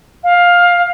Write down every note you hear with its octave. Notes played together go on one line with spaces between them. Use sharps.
F5